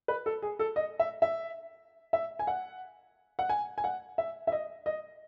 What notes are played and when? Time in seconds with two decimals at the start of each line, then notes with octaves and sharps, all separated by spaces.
0.08 B4
0.26 A4
0.42 G#4
0.59 A4
0.76 D#5
0.99 E5
1.22 E5
2.13 E5
2.39 G#5
2.47 F#5
3.39 F#5
3.49 G#5
3.78 G#5
3.84 F#5
4.18 E5
4.47 E5
4.52 D#5
4.86 D#5